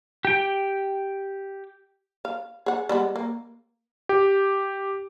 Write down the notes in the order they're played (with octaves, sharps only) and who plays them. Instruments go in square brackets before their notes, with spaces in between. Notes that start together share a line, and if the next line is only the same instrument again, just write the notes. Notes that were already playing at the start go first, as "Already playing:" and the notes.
[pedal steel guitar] G4 G5
[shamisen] F5
G#4 F#5
G3 G#3 B3
A#3
[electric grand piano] G4